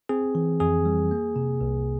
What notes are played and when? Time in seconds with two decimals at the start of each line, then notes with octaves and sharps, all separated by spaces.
0.09 C4 G#4
0.35 E3
0.60 F2 G#4
0.85 G3
1.11 A#3
1.36 C3
1.61 C2